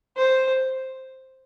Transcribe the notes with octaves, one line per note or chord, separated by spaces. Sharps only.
C5